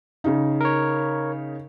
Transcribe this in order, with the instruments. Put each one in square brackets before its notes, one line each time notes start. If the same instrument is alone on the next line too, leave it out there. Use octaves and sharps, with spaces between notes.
[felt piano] C#3 D#4
[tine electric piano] A#4 C#5